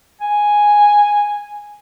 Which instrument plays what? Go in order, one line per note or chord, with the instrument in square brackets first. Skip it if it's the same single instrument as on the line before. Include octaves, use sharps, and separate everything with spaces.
[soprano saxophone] G#5